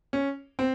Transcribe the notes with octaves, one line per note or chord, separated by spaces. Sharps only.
C#4
C4